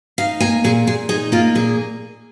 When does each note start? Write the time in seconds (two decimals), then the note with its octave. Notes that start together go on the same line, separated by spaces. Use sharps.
0.18 D#4 F5
0.40 A#3 G#5
0.64 A#2 G#4
0.87 A#2 G#4
1.09 D#4 G#4
1.32 A#3 F4
1.55 A#2 G#4